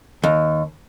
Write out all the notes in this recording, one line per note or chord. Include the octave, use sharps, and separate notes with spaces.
D#2